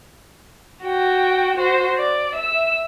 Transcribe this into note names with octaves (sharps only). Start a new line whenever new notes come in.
F#4 G5
F#4 C5
D5
E5 E6